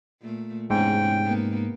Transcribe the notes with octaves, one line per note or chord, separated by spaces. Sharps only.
A#2 A3
E2 G#2 C3 C#4 G5
A#3 B3